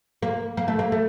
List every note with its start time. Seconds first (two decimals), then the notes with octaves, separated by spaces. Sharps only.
0.22 A#3
0.57 A#3
0.68 A3
0.79 A#3
0.92 A3